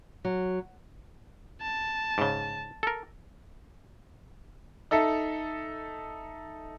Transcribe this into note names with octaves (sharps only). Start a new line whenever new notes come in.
F#3
A5
G#2 C#3
A4 A#4
D#4 A4 E5